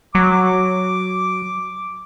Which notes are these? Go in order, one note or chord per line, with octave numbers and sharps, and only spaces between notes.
F#3 D6